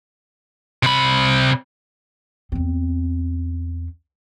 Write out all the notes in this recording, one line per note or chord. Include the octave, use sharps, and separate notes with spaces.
C3 B5
E2 C4